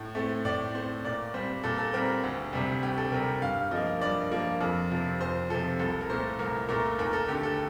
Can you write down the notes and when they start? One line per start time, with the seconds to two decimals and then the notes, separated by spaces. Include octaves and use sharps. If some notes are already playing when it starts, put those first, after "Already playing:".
Already playing: A2
0.15 A3 C4
0.45 A2 D5
0.74 A3 C4 C5
1.05 A#2 D5
1.34 G3 C4 C5
1.64 A#2 A4
1.78 A4
1.93 G3 C4 A#4
2.23 D2
2.53 C3 G3
2.82 D2 G4
2.98 A4
3.12 C3 G3 A#4
3.42 G2 F5
3.71 F3 A#3 D#5
4.01 G2 D5
4.32 F3 A#3
4.61 F2
4.91 C3 F3
5.20 F2 C5
5.50 C3 F3 A4
5.79 C2 A4
6.01 A#4
6.09 A#2 A3 C5
6.39 C2 A#4
6.68 A#2 A3 A#4
6.99 D#2 A#4
7.13 A4
7.28 D3 A3 G4
7.43 A4